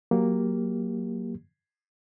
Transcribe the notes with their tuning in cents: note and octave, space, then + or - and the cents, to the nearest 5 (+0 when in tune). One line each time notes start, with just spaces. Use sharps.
F#3 +0 A#3 +0 G4 +5